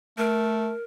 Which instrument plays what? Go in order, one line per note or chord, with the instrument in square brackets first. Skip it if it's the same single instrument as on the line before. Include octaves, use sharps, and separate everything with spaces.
[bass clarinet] A3 [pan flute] A#4